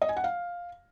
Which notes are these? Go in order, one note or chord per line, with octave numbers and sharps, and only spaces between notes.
D#5
G#5
F#5
F5